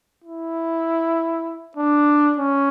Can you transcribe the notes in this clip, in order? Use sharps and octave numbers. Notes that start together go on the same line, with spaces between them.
E4
D4
C#4